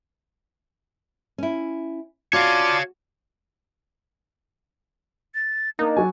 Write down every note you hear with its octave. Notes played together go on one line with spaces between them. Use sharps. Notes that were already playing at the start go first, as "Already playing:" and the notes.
C#4 E4
F4 F#4 C#5 D5 F5 A5
A6
A#3 D4 D#4
F#3 F#4 G#5